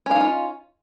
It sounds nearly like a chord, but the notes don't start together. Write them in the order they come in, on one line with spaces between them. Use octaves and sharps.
C#4 F5 D#4 F4